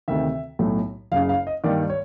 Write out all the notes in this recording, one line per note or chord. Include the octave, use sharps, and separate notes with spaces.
D2 C3 D#3 E5
B1 A2 F#3 A3
F#1 F#2 C#3 F5
F5
D#5
G2 D#3 G3 A#3 D5
C#5